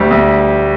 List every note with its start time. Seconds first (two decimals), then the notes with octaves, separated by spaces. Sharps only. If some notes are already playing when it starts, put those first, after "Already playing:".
Already playing: D2 G3
0.11 D2